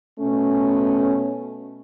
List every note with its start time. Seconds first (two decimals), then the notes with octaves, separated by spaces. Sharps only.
0.20 B2 A3 C#4